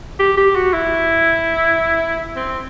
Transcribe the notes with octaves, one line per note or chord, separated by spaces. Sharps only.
G4
G4
F#4
E4
C4